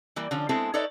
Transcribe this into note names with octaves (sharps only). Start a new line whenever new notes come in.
E3 G3 A#3
D3 F3 C#4 F4
G#3 B3 C4 E4 G#4 A4
D#4 A4 B4 C#5 D5 E5